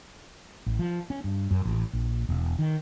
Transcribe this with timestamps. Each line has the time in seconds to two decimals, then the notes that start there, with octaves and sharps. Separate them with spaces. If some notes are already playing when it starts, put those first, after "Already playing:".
0.66 A1
0.79 F3
1.10 C#4
1.24 G2
1.51 F#2
1.65 A1
1.93 A#1
2.29 E1
2.59 D#3